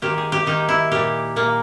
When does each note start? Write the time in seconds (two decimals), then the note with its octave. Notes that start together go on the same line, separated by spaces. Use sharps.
0.02 D#3 A#3 G4
0.18 G#4
0.32 G4
0.46 D#3 A#3 D#4
0.69 E4
0.91 A#2 A#3 G4
1.36 A#2 A#3